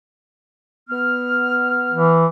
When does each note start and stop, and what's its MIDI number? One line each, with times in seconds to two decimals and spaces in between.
0.89 2.15 59
0.89 2.15 89
1.92 2.26 52